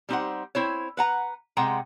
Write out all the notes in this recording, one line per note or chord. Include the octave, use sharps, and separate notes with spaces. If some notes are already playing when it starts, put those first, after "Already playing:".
G3 C4 D#4 G4 C5 F#5
C4 E4 C5 C#5
B4 F#5 A#5
C3 G#3 F#5 G5 A#5